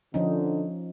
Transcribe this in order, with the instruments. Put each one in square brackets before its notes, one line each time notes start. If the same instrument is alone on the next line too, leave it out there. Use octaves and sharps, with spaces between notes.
[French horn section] D3 [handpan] F3 C#4 D#4